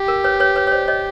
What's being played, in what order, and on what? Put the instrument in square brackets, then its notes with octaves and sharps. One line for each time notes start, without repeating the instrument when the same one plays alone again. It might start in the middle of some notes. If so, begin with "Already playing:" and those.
Already playing: [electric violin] G4
[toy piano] A#4
B4 C#5
B4 C#5
B4 C#5
C#5
C5 D5
C#5 D#5